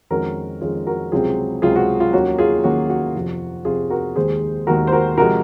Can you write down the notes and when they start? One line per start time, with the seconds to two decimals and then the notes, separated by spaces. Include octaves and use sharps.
0.10 F2 D#3 G#3 C#4 F#4 A#4
0.61 F2 D#3 G#3 C#4 F4 G#4
0.87 F#4 A#4
1.12 C#2 C3 F#3 C4 F4 G#4
1.62 C#2 C3 F#3 C4 F4 G#4
1.76 F#4
2.00 F4
2.13 D#2 D#3 F#3 A#3 C#4 F#4
2.39 F4 G#4
2.64 D#2 D#3 F#3 A#3 C#4 F#4
2.90 F#4
3.15 F2 C3 F3
3.65 F2 C3 F3 F4 G#4
3.90 F#4 A#4
4.16 D#2 D#3 G#3 G#4 C5
4.67 D#2 D#3 G#3 F#4 A#4
4.87 C5
4.92 F#4 A#4
5.17 C3 F3 G#3 F#4 A#4